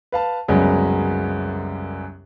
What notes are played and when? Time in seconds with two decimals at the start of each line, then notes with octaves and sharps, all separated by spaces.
0.12 B4 F5 A5
0.48 C2 F#2 C#3 F#3 G#3 B3